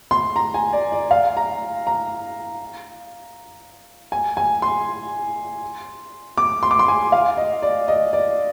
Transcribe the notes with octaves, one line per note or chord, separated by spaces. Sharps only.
C6
A#5
G#5
D5
D5
F5
A#5
A#5
G#5
G#5
C6
D6
C6
D6
C6
G#5
F5
D#5
D5
D#5
D5